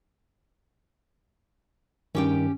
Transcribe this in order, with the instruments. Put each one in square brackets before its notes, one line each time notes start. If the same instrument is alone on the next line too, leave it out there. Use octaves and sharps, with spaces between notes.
[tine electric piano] G2 D#3 [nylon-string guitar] C#4 G4 G5